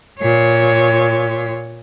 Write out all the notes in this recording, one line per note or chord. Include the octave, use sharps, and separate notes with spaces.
A#2 C#5